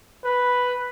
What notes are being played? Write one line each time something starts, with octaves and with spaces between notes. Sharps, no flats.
B4